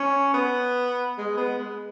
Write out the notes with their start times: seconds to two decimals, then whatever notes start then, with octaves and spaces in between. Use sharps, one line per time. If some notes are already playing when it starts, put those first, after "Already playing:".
Already playing: C#4
0.34 B3
1.18 G#3
1.37 B3
1.58 G#3